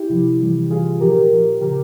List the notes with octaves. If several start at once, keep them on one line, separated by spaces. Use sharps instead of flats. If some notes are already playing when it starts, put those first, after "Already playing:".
Already playing: E4 G4
C3 F3
C3 E3 G3
C3 E3 G3 F4 G#4
A#2 F3 G4 A#4
A#2 F3
C#3 F3 G4 A#4